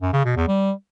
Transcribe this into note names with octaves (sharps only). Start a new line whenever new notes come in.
F#2
C#3
B2
E2
G3